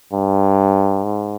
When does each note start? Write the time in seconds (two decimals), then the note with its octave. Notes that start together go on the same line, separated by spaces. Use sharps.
0.13 G2
1.04 G#2